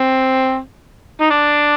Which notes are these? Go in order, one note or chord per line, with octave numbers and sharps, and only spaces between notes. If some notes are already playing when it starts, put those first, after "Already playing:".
Already playing: C4
D#4
D4